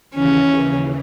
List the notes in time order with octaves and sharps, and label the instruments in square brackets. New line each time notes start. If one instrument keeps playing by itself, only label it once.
[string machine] D#2 C#3 E3 [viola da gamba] C#4